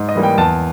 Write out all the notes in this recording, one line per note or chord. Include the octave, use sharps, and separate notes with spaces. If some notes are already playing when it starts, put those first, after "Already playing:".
Already playing: G#2
D#5
E3 G3 A#3
G5
E2 A5